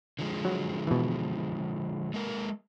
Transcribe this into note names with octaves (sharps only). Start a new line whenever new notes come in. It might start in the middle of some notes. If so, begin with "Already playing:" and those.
D3 F3 G#3
F#3
B2 E3
G#3 A#3 A#4